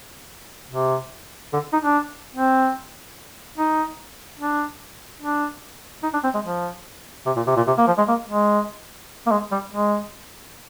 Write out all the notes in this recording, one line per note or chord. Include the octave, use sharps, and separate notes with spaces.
C3
D3
D#4
D4
C4
D#4
D4
D4
D#4
D4
C4
G#3
F3
C3
A#2
C3
A#2
C3
A#3
F3
G#3
A#3
G#3
A#3
G#3
G3
G#3